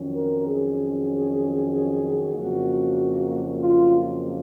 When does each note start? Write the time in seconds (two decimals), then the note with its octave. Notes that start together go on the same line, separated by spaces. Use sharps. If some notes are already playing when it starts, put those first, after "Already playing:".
Already playing: F2 D#3 F#3 C#4
0.14 A#4
0.46 G#4
2.33 F2 C#3 F#3 A#3 F#4
3.60 F4